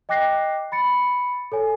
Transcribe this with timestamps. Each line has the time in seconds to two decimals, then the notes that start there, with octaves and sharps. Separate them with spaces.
0.09 D#5 G5 D6 F#6 A#6 C7
0.72 B5 A6 C#7
1.52 A4 C#5 G#5